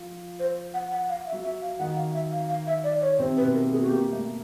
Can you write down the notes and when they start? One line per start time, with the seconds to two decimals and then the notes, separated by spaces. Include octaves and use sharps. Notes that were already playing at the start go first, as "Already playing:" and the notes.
Already playing: F3 F4
0.39 C5
0.74 F#5
0.92 F#5
1.09 F5
1.27 E5
1.32 F#3 F#4
1.44 E5
1.61 F5
1.79 D#3 D#4 F#5
1.96 F5
2.14 E5
2.31 F5
2.49 F5
2.67 E5
2.84 D5
3.01 C#5
3.19 C3 C4 C5
3.37 B4
3.42 B2 B3
3.54 A#4
3.65 A#3
3.72 G#4
3.81 F#4
3.88 A#3 G4
4.12 A3